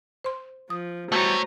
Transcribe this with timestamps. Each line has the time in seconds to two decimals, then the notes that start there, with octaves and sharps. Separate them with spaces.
0.24 C5 C6
0.70 F3 D#6
1.12 E3 G3 A3 B3 F#4 C5 C#5 A#5